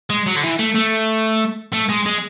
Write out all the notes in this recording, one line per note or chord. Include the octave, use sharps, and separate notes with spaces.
G#3
F#3
D3
E3
A3
A3
A3
G#3
G#3